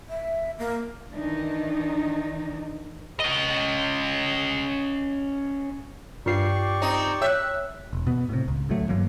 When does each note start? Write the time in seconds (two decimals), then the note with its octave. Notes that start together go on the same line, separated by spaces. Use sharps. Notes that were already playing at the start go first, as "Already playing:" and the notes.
0.09 E5
0.59 A#3
1.15 D#3 E3 D4 D#4
3.20 C#4 D#5
6.26 G2 F4 G4 B4 D5 F5 C#6 C7
6.82 C4 D#4 G5
7.22 C#5 E5 G5 E6 F#6
7.93 E1
8.07 B2 B3
8.29 A2 C3
8.48 C#2
8.69 A1 D2 F#3 A3
8.89 G2 E3 F#3 A#3